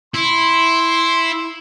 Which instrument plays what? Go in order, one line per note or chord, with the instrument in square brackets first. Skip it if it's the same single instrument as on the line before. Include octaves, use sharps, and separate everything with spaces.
[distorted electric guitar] E4 [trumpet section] C6